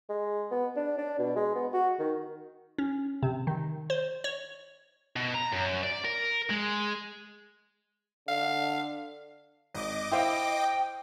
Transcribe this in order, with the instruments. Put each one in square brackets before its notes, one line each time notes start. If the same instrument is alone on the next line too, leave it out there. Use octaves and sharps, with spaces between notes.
[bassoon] G#3
B3
D4
D4
B2
G#3
B3
F#4
D#3
[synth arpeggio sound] C#4
C3
D#3
C5
C#5
[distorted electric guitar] B2
A#5
F#2
D5
A#4
G#3
[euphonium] D3 [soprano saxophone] F5
[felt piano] G#1 [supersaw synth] D#5 D6
[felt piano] E4 C5 F5 [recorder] G5